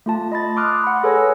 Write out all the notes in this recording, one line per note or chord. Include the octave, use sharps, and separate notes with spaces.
A3 F4 A5
D#5 B5 A6
C6 D6 D#6 F6 F#6
F#5 B5
G#4 A4 B4 C#5 G#5 E6